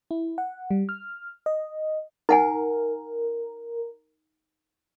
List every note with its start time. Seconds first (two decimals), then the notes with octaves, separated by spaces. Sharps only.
0.11 E4
0.38 F#5
0.71 G3
0.89 F6
1.46 D#5
2.29 D#4 A#4 F#5 G#5